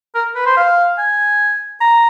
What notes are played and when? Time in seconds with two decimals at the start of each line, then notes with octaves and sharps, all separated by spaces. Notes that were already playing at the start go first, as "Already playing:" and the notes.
0.15 A#4
0.35 B4
0.46 C5
0.57 F5
0.98 G#5
1.81 A#5